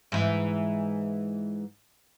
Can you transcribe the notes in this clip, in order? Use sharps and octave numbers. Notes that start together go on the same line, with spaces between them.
G#2 E3